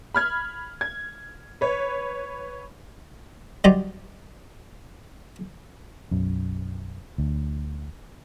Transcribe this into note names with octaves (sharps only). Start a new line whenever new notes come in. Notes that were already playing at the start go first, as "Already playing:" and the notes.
B5 F6 G#6
G#6
B4 C#5
F#3 G3 D#4 C5 D5
B1 F#2
D2